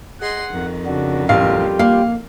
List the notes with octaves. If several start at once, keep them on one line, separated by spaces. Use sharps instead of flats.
G#4 D#5 F#5 C6
F2 D#3
C#3 D4 F#4
A1 D2 G3 F4 G4 F5
A#3 F5